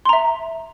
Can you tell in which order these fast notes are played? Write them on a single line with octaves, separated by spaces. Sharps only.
C6 A#5 E5